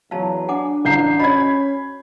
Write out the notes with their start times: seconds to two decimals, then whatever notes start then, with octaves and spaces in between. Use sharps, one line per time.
0.11 E2 F#3 F5 A5
0.49 D4 F#5 G#5 D6
0.85 A1 A#4 F5 A#5 G6 C7
1.19 C#4 F#4 C5 D#5 B5 G#6